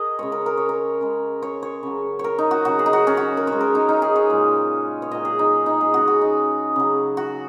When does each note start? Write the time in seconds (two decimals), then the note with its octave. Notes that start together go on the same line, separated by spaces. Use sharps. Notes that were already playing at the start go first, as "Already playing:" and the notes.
Already playing: G#4 A#4 D#5
0.19 C#3 G#3 C#5
0.32 A#4
0.46 A#4
0.57 C#5
0.69 A#4
1.01 C#3 G#3
1.42 C#5
1.63 C#5
1.83 C#3 F#3
2.19 C#5
2.24 A#4
2.38 D#4
2.51 F#4
2.65 C#3 F#3 F#4
2.79 G#4
2.86 D#4
2.93 F#4
3.07 C#4
3.17 F#4
3.37 A#4
3.47 C#3 G#3 C#5
3.61 A#4
3.75 D#4
3.89 D#4
4.02 G#4
4.16 C#5
4.30 A#2 G#3
5.02 C#5
5.11 A#2 F#3 D#5
5.25 G#4
5.39 D#4
5.66 D#4
5.81 G#4
5.94 C#3 G#3 F#4
6.08 F#4
6.22 D#4
6.76 C#3 F#3
7.17 F#4